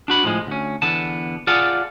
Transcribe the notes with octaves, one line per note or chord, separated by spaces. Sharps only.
D4 F#4 B5
A2 F3 G#3
D2 C#4
E2 D3 B3 A5
F4 G#4 D5 F5 F#5 A5